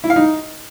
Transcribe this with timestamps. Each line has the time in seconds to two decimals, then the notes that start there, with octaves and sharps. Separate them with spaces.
0.04 E4
0.10 F5
0.16 D#4